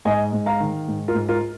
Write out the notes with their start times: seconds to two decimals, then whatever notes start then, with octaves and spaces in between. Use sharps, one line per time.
0.05 G#2 D#5 G#5
0.33 G#2
0.46 F5 A#5
0.60 D#3
0.88 G#2
1.08 F4 A#4
1.15 G#2
1.29 F4 A#4